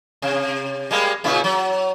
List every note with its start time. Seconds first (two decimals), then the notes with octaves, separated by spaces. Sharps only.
0.22 C3
0.91 G3 G#3 A#3
1.24 A#2 C#3 E4
1.44 F#3